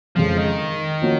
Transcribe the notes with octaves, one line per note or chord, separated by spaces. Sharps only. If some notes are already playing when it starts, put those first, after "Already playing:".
F2 C#3 F3 G#3
D#3
F3 A#3 C#4 F#4